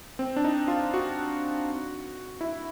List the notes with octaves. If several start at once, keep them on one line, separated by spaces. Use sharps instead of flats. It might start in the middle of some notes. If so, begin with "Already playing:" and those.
C4
D4
D#4
F4
F#4
E4